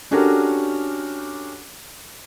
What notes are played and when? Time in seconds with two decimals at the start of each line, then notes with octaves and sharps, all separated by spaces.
0.11 C#4 D4 F#4 G4 A4 A#4